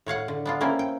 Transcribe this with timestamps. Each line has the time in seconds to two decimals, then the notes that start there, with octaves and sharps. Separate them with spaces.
0.06 A2 C#5 F5 F#5
0.28 D3
0.46 B3 D4 F4
0.61 A#3 C4 C#4 E4 A#4
0.79 G5